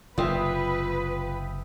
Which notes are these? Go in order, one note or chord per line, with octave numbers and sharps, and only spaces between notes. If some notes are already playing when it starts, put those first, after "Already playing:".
F#1 C3 F4 B4 D#5 E5 G5